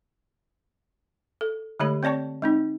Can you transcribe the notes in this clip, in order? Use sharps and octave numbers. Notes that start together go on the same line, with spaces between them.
A4
D3 G#3 A3 G4 C#5 B5
C4 C#5 D5 A5 C#6
G#3 C4 D#4